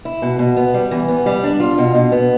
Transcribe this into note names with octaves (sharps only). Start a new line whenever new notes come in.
E4
B2
B2
B3
G3
E3
B3
G3
D4
F4
B2
B2
B3